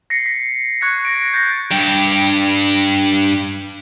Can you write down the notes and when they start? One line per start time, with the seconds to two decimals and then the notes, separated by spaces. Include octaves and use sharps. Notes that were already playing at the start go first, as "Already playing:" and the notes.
0.10 A#6 C7 C#7
0.26 B6
0.81 C#6 F#6 G#6 C7 C#7
1.05 A#6 D7
1.34 G6 A6 A#6
1.72 G2 G4